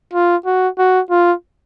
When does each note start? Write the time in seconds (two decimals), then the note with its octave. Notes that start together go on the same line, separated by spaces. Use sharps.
0.13 F4
0.45 F#4
0.78 F#4
1.10 F4